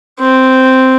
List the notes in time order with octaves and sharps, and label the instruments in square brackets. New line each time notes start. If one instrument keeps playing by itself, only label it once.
[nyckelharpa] C4